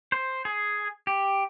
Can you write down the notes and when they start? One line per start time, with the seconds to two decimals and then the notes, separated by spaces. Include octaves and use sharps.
0.12 C5
0.45 G#4
1.07 G4